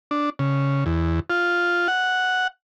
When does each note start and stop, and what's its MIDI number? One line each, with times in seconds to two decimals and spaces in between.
0.11 0.30 62
0.39 0.84 49
0.86 1.20 40
1.30 1.88 65
1.88 2.47 78